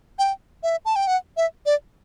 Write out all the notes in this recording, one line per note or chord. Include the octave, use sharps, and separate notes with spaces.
G5
E5
A5
G5
F#5
E5
D5